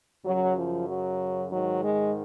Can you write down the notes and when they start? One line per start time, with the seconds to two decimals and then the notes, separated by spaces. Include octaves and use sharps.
0.23 F#2 C#3 F#3
0.55 F3
0.87 F#3
1.50 G#2 D#3 F#3
1.82 G#3